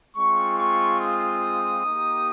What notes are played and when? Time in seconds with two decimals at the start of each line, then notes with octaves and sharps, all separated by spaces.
0.16 G#3 C4 F4 C#6
0.57 C#6
1.00 D#6
1.85 A#3 D#4 G4